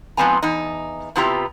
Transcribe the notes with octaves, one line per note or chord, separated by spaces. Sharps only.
G#2 F3 B3 C4 G#5 A#5
E2 D#4
C3 B3 E4 F4 G4 A#5